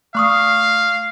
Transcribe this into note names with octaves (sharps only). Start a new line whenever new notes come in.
A3 F5 C#6 D#6